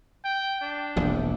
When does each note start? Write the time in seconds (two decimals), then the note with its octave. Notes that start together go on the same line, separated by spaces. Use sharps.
0.24 G5
0.61 D4
0.96 E1 A#1 C3